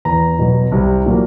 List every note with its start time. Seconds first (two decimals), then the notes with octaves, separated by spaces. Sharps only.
0.05 E2 A#5
0.39 B2 F#3
0.72 C2
1.06 A#2 F#3 A#3